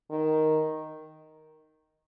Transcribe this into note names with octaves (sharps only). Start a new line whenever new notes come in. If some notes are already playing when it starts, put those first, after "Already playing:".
D#3